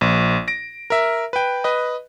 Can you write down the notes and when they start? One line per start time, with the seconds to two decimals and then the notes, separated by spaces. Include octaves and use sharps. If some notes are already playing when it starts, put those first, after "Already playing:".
0.01 A#1
0.48 A#6 D7
0.90 A#4 E5
1.33 B4 G5
1.64 B4 D#5